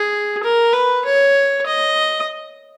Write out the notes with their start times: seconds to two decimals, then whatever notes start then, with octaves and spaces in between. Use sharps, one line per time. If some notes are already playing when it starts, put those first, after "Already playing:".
Already playing: G#4
0.43 A#4
0.73 B4
1.05 C#5
1.66 D#5